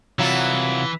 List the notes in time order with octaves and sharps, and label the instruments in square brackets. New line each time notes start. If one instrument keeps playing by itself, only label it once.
[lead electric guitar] C3 E4 [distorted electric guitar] E3 [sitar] F#3 F4